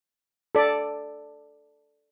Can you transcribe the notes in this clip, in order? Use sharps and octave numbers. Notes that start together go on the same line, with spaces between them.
A4 D5